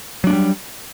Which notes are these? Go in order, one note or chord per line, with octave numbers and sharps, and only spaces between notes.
F#3 G3 A3 D4